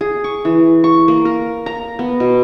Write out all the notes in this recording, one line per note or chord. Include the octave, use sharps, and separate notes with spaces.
G#4
C#6
E3
C#6
A#3
A#4
A#5
B3
B2